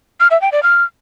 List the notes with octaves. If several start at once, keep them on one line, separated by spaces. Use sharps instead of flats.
F6
E5
G5
D5
F6